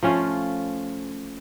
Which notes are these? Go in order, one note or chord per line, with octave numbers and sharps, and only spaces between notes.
F3 A3 C#4 F4